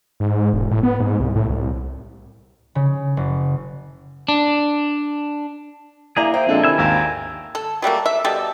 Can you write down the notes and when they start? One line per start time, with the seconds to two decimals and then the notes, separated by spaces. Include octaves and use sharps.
0.20 G#2
0.53 E1
0.71 A2
0.83 B3
1.00 G#2
1.20 C2
1.36 A2
1.50 C2
2.75 C#3
3.17 F#1
4.28 D4
6.17 A#3 D4 E4 G#4 A#5
6.34 C5 E5 G5
6.47 A#2 F3 G#3 C4 D4 A4
6.64 C3 D#3 E4 G#5 E6
6.78 G#1 D#2 F5 G5 A#5
7.55 A4
7.82 F#3 G3 A3 A#3
8.06 E5
8.24 B2 G3 A4